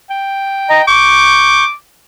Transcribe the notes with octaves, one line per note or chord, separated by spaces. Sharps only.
G5
D#5 A#5
C#6 D6 G6